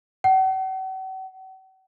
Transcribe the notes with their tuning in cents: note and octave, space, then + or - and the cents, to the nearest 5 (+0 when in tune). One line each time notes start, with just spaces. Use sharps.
F#5 +45